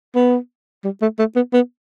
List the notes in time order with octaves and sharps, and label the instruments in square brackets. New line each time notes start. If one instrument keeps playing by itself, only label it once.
[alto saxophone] B3
G3
A3
A3
B3
B3